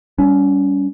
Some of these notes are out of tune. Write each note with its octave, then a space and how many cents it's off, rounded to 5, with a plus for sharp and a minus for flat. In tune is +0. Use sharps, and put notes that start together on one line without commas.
G3 +0 C#4 +25